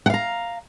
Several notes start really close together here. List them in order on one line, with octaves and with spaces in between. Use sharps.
F#5 F5 A#5